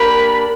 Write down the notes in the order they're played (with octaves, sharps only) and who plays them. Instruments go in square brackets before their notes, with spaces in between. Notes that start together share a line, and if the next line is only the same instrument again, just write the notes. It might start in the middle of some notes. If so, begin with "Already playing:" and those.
Already playing: [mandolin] A#3 D4 G4 A#4 [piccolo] B5